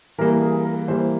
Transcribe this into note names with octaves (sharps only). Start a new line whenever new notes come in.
E3 G3 A#3 A#4
G#4
A#4
E3 G3 A#3 C5